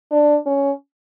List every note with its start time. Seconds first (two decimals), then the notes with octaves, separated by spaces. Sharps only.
0.12 D4
0.46 C#4